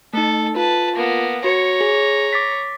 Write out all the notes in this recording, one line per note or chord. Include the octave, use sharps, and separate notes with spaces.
A3 D#4 A4
F4 B4 A5
A#3 B3
F#4 C#5 A#5 C#7
G#4
D6 A6 B6